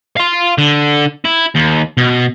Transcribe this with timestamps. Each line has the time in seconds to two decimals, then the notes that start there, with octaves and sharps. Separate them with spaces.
0.16 F5 C6
0.58 D3
1.25 E4
1.55 D#2
1.98 B2